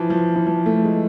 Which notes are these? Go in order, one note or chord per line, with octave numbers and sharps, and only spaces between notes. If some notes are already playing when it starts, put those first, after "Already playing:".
Already playing: E3 F3
F3
E3
F3
A3
G#3